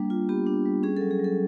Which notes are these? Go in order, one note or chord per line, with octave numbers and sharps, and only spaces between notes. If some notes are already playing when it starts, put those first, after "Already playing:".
Already playing: G3 A#3 D4
F4
B3 G4
D4
G3
C#4 G#4
F#3 A4
G#4
F#3 A4